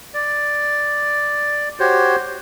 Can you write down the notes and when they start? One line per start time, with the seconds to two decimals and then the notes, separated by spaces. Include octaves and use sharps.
0.14 D5
1.80 F#4 G4 C5 C#5